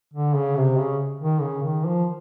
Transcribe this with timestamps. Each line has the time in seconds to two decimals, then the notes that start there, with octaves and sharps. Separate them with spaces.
0.14 D3
0.34 C#3
0.56 C3
0.78 C#3
1.21 D#3
1.42 C#3
1.63 D#3
1.85 F3